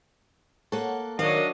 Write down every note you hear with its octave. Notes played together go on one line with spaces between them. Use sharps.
A#3 A4 C#5 F#5
D#3 F#3 D4 A#4 C#5 D#5 F5